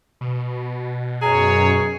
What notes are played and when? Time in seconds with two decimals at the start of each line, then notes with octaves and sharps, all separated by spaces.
0.21 B2
1.22 F#2 G#4 C#5 A#5